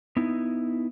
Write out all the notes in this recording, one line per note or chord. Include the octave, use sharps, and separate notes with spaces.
B3 D#4 E4